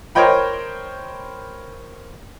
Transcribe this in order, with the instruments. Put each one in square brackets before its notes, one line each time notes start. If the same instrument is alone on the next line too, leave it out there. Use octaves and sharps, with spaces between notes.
[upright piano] A#4 C5 C#5 D#5 G5 B5